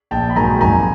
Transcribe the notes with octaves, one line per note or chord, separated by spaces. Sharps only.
A#1 G5 A5
B5
G#2 D#3 F#3 G#5 A#5
F2 G#5 A#5